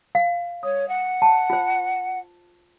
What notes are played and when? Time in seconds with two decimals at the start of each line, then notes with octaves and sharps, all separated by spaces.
0.15 F5
0.63 C#5 D#6
0.88 F#5
1.22 A5
1.50 F4 C5